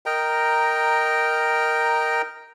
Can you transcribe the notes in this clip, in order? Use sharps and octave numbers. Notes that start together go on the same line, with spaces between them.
A#4 D#5 G5 A#5